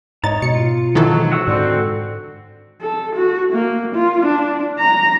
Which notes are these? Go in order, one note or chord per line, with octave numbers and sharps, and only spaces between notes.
G#2 C#5 D#5 A#5 A6
B2 C#7
F4
G#2 D#3 E3 F#3 A4
F#4 F#5 E6
G#2 D3 C4
A4
F#4
A#3
F4
D4
A#5